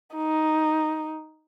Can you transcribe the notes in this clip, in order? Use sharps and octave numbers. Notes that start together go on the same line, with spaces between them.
D#4